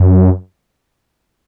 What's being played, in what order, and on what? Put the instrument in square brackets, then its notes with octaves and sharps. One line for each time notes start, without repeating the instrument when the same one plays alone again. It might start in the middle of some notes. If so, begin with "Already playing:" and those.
Already playing: [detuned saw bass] F#2